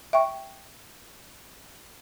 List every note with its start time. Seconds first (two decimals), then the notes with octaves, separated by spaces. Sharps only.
0.13 E5 G5 C#6